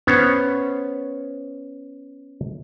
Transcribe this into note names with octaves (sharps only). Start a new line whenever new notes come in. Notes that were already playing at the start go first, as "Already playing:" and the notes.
B3 C#4 C5 C#5